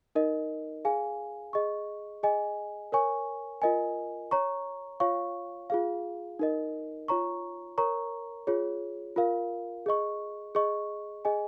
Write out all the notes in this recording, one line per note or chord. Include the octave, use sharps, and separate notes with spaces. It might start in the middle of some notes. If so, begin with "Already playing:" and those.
D#4 A#4 D#5
G#4 F5 G#5
G#4 D#5 C#6
G#4 D#5 G#5
A#4 C#5 G#5 C#6
F4 A#4 D#5 G#5
C#5 A#5 C#6
F4 C#5 F5 C#6
F4 G#4 F5
D#4 A#4 D#5
F4 C#5 A#5 C#6
A#4 C#5 A#5 C#6
F4 G#4 C#5
F4 A#4 F5
G#4 D#5 C#6
G#4 D#5 C#6
G#4 D#5 G#5